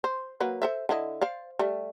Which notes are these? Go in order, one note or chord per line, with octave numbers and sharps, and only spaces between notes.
C5
F#3 A#3 B4
A4 C5 E5
D3 E4 D#5
C5 D5 F5
G3 A3